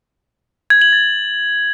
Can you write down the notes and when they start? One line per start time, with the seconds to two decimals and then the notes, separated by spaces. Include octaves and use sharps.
0.70 G#6
0.81 F#7
0.93 A6